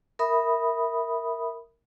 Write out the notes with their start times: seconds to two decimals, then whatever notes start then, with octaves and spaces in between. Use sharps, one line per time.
0.19 A#4 E5 B5 D#6